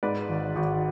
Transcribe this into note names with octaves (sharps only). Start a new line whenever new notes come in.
G#2 B4 D5
G#1
G#1